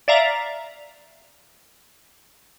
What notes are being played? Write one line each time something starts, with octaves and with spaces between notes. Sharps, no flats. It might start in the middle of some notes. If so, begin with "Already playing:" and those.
D5 E5 F5 A#5